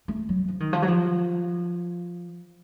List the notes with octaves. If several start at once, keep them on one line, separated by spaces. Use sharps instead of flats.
A3
F#3
F3
D#3
F3
F#3
F3